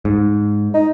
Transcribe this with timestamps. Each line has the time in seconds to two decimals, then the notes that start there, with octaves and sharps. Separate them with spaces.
0.05 G#2
0.74 D#4